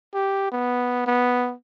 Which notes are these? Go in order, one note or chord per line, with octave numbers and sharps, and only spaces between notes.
G4
B3
B3